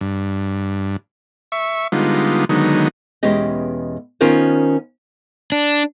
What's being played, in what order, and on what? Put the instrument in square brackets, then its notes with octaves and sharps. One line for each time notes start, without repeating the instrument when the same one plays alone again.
[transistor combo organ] G2
E5 C#6
D3 G3 G#3 B3 D#4 F4
D3 D#3 F#3 G#3 B3 D#4
[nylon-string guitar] E2 B2 G#3 C#4 G4 D#5
D#3 B3 C#4 F4 A#4 C5
[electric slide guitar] D4